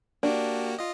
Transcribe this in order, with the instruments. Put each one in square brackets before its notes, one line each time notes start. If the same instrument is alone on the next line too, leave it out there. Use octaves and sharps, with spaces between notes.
[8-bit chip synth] A#3 F#4 G4 [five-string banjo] D4
[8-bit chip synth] F4 D#5